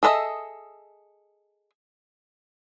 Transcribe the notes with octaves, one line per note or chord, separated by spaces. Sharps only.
G#4 A4 B4 D#5 E5